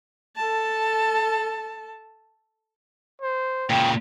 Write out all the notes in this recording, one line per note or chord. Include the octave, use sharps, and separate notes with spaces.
A4 A5
C5
A#2 C#3 G5